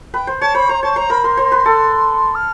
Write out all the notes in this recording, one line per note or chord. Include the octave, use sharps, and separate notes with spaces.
B4 G5
C5
C#5 A5
C5 B5
C5 A#5
C#5 A5
C5 A#5
A#4 B5
A#4 C6
C5
B4
A4
F6